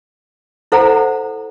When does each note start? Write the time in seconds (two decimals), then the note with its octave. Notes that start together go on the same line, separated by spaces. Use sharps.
0.72 E4 A4 C5 F5 F#5 A#5